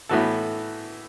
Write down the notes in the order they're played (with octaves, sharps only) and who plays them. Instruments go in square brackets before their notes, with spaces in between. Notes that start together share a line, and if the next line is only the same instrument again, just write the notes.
[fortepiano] A2 E3 B3 F#4 A4